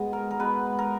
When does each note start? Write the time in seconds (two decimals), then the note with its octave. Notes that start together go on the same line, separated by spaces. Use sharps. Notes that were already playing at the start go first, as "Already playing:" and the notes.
Already playing: B2 G#3 D#5
0.13 A#4
0.31 A#4
0.39 B2 G#3 B4
0.79 A#4